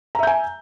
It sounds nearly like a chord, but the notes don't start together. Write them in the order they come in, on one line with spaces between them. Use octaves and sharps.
A#5 E5 G6 G#5